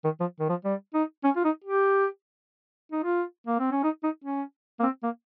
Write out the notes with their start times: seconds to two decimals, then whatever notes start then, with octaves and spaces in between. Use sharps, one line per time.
0.04 D#3
0.20 F3
0.39 D#3
0.49 F3
0.65 G3
0.94 D#4
1.24 C#4
1.36 F4
1.44 D#4
1.64 G4
2.92 D#4
3.04 F4
3.47 A#3
3.59 C4
3.72 C#4
3.83 D#4
4.03 D#4
4.24 C#4
4.80 A#3
4.83 C4
5.03 A#3